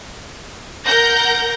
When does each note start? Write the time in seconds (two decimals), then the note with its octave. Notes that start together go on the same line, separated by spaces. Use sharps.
0.84 A#4 F#5 G6 A#6